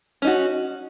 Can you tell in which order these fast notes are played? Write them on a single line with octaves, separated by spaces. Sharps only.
C#4 D#4 F#4